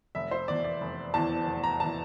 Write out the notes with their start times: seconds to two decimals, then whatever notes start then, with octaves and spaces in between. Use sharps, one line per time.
0.15 F1 E5
0.31 C5
0.48 E2 E3 D5
0.64 D5
0.81 F1
1.14 E2 E3 A5
1.47 F1
1.64 A#5
1.80 E3 A5